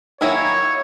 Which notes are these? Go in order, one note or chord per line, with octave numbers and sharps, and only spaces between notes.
D#3 F#3 A#3 E4 G#4 C#5